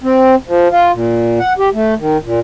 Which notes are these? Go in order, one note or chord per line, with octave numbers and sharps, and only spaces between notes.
C4
F3
F4
A#2
F#5
G4
A3
D#3
A#2